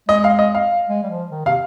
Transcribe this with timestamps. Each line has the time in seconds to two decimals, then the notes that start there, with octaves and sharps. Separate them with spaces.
0.08 G#3 D#5
0.24 F5
0.39 D#5
0.55 F5
0.89 G#3
1.03 G3
1.10 F3
1.30 D#3
1.45 C3 F5